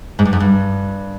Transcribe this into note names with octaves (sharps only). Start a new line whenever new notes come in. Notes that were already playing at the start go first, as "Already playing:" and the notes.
G#2
G2
F#2
G2